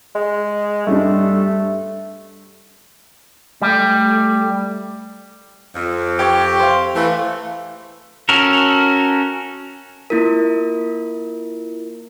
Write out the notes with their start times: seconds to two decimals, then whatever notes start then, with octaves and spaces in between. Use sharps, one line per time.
0.15 G#3
0.87 G2 G3 A3 D4
3.62 G3 A3
5.76 F2
6.19 G4 C#5 G5
6.60 C5 F5
6.95 E3 A3
8.29 C#4 F#4 A4 A#4
10.10 A#3 E4 F4 A#4